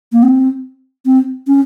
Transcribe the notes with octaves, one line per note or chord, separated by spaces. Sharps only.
A#3
C4
C4
C#4